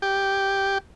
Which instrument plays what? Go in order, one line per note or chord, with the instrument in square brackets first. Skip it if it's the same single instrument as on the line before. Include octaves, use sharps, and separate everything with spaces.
[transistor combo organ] G4